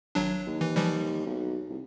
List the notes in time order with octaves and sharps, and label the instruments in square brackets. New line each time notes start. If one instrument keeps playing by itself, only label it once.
[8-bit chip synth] G#1 F#3 D4
[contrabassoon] D#2
[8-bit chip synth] E3
E3 F3 G3
[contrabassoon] B1
C2